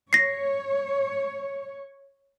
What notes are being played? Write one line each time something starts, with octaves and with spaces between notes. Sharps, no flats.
C#5 A#6 C7